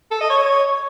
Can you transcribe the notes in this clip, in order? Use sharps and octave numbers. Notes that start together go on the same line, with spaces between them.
A4
D#5
C#5